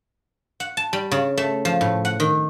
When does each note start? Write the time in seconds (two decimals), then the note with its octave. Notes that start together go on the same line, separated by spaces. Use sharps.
0.60 F#5
0.77 A5
0.93 G3
1.11 C#3
1.38 A3
1.65 F3
1.81 A2
2.05 F#5
2.20 D#3